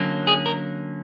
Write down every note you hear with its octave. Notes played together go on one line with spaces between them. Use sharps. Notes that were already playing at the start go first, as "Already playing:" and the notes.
Already playing: D3 F#3 A#3 C#4
G#4
A#4